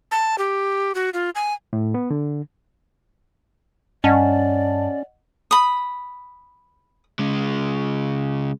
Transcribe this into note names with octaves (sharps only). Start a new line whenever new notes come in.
A5
G4
F#4
F4
G#5
A2
B3
D3
G2 C#4 D5 D#5 F#5 A5
B5 D#6
C#3 G#3